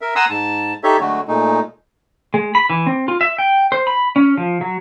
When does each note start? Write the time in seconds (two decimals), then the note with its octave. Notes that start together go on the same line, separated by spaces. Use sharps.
0.01 A#4 E5
0.16 F#5 G#5 A#5 C6 D#6 E6
0.30 G#2 A5
0.83 D#4 G4 A4 C#5 E5
1.00 D3 F#3 G#3 A3 F#4
1.28 A#2 G#3 A3 D#4
2.34 G#3
2.55 B5
2.70 E3
2.87 C4
3.08 F4
3.21 E5
3.38 G5
3.72 C5
3.87 B5
4.16 C#4
4.37 F3
4.61 F#3